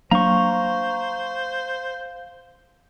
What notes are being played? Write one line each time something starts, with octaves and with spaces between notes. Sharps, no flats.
F#3 A#3 D4 C5 F5 A#5 C#6